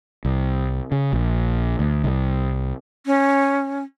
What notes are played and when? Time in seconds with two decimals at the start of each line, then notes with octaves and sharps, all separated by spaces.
0.25 C2
0.92 C#3
1.13 A#1
1.79 D2
2.04 C2
3.06 C#4